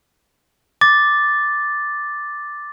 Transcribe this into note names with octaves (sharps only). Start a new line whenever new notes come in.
D6 A6